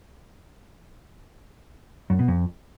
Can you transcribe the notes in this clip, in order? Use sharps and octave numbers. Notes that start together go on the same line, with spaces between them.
F#2
B2
F2